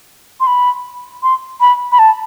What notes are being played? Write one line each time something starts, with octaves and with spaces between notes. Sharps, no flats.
C6
B5
C6
B5
B5
A5